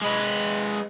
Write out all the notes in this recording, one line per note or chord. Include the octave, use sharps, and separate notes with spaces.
G#3 B4